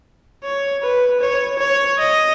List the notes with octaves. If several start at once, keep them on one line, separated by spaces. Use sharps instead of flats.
C#5
B4
C#5
C#5
D#5